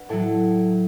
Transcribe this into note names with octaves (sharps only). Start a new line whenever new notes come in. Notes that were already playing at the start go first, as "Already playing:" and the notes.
Already playing: D4 F#4 B4
A2 F#3 E4 A4